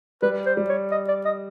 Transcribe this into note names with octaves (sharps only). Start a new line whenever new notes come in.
G3 B4
C5
G3
C#5
D#5
D5
D#5